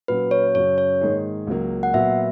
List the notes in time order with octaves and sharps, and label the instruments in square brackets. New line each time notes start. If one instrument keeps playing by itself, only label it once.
[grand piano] A#2 F#3 C#4 F#4 [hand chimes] B4
[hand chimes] C#5
[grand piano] F#2 C#3 F#3 [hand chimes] C#5
[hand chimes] C#5
[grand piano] G#2 D#3 A#3 D#4 G#4
C#2 C#3 F#3 A#3
[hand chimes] F#5
[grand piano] A#2 F#3 B3 F#4 [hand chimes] E5